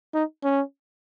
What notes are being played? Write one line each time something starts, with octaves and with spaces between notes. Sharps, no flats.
D#4
C#4